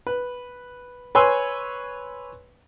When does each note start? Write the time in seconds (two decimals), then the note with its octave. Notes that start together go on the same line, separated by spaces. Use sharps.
0.07 B4
1.15 B4 C#5 G#5 C6 E6